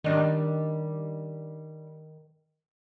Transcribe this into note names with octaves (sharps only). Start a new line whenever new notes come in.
D#3 G3 D4 D#4